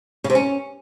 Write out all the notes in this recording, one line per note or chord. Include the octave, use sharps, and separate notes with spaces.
C#3
C3
C#4